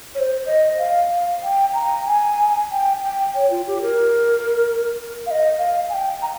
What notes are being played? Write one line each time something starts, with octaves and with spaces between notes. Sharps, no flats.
C#5
C5
D#5
F5
F5
G5
A#5
G#5
G5
G5
C#5
F4
G4
A#4
F5
D#5
F5
G#5
G5
A#5